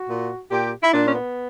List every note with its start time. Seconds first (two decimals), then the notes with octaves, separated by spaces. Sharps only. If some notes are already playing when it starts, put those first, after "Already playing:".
Already playing: F#4
0.09 A#2
0.51 A#2 G4
0.82 E4
0.92 A#2 D4
1.08 C#4
1.14 B3